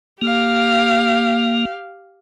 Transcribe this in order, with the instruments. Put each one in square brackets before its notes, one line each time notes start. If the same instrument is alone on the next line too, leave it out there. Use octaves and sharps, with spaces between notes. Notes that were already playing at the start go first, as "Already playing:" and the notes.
[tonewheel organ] A#3 [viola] G4 F5